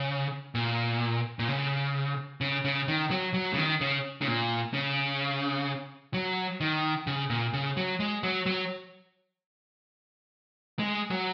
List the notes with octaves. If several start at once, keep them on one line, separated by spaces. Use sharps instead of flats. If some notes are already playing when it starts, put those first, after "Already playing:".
Already playing: C#3
A#2
A#2
C#3
C#3
C#3
D#3
F#3
F#3
C#3
D#3
C#3
C#3
A#2
C#3
F#3
D#3
C#3
A#2
C#3
F#3
G#3
F#3
F#3
G#3
F#3